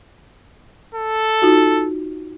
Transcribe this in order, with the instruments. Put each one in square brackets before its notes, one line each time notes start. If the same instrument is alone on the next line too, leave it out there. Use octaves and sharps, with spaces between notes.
[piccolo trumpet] A4
[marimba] D#4 F4 F#4